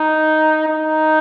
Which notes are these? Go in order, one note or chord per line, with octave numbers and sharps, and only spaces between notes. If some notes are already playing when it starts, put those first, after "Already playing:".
Already playing: D#4
D#4